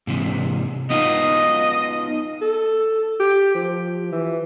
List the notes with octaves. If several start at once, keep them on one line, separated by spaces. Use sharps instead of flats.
G#2 C3 E3
B3 D#4 F4 D#5
A4
G4
F3
E3